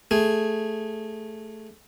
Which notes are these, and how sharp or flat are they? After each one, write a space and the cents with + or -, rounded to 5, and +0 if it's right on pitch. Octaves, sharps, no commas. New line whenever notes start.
A3 +0 G#4 +0